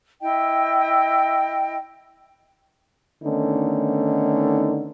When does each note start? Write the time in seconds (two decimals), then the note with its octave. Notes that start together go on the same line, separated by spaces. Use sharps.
0.21 E4 D#5 G5
3.23 D3 D#3 A3 B3 C#4 D#4